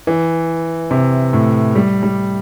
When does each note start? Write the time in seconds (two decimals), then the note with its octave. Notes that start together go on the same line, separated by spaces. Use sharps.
0.07 E3
0.91 C3
1.33 A2
1.75 G3
2.03 G3